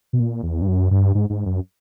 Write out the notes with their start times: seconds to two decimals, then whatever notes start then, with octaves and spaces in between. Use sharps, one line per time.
0.13 B2
0.20 A#2
0.43 E2
0.62 G2
0.67 F#2
0.91 G2
1.15 G#2
1.30 G#2
1.46 F#2